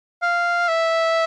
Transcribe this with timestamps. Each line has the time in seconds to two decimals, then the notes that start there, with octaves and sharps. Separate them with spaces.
0.22 F5
0.68 E5